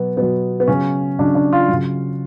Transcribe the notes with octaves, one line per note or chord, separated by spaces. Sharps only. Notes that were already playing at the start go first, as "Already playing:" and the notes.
Already playing: B2 F#3 B3
B2 F#3 B3
B3
C#3 F#3 C#4
C#3 F#3 D4
D4
F4
C#3 F#3